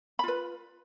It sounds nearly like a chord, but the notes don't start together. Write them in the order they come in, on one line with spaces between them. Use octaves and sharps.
B5 F4 B4